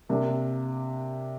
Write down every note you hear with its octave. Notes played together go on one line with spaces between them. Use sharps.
C3 A#3 D4